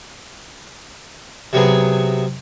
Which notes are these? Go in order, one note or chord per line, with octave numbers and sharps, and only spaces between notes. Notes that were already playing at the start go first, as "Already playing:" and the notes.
C3 F#3 B3 G#4